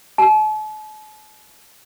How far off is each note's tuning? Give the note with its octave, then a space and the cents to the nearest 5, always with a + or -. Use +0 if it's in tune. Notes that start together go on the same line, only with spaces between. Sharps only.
A5 -45